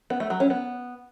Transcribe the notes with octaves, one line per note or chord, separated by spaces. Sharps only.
B3
A3
F#3
C#4
B3